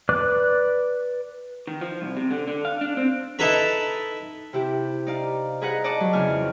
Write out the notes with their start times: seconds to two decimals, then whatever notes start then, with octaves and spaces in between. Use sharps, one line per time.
0.09 B4 D5 D6 F#6
1.67 D#3
1.81 F3
2.02 C2
2.17 C3
2.31 D3
2.48 D3
2.65 F5
2.81 D4
2.97 C4
3.39 D#4 E4 A4 B4 A#5
4.53 C3 E4 G4
5.07 D#4 D5 F5
5.61 G#4 A#4 B4 D#5 F#5
5.84 D5 D#5 F#5 A5 D6
6.00 F#3
6.13 F2 C#3 E4 G#5 F6